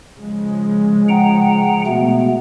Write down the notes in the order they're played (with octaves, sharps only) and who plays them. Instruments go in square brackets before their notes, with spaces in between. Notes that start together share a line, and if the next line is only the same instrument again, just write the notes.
[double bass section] C#3 F3 G#3
[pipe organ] F#5 G5 A#5
B2 A3 B3